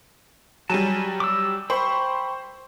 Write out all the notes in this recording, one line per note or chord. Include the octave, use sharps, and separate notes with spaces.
F#3 G3 G#5 A5
D6 E6
C5 G5 B5 C#6